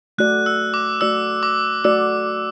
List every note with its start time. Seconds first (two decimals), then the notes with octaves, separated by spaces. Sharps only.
0.18 A3 F#4 D5 F#6
0.46 E6
0.74 D6
1.01 A3 F#4 D5 E6
1.43 D6
1.84 A3 F#4 D5 E6